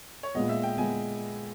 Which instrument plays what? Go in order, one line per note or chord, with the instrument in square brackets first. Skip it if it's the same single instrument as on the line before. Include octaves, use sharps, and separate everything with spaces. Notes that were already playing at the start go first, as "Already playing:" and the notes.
[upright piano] C#5
[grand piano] A#2 G#3 B3 [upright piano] D#5
[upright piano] E5
G5
[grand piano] G#3 B3 [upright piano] G#5